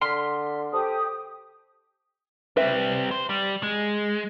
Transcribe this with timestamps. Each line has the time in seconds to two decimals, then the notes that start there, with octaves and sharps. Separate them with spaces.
0.02 D3 C6 F6 B6
0.73 G4 A4 C5 A5 D#6
2.57 G3 C4 B4 E5
3.11 C5
3.30 G3
3.63 G#3